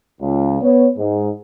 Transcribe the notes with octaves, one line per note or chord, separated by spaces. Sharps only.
C#2
B3 C#5
G#2